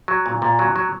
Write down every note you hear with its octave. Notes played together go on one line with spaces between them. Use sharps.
F#3
A#2
A#2
F#3
F#3